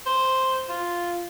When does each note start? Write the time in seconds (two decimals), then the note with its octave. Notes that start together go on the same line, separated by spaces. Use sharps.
0.06 C5
0.69 F4